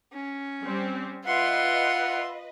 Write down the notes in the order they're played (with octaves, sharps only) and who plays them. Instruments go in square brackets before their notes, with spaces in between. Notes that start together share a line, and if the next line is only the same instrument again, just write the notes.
[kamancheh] C#4
[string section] G3 C4 G4
[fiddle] F4 [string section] B4 D#5 [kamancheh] E5 C6 [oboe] F#5